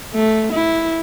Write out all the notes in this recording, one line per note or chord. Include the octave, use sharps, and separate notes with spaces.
A3
E4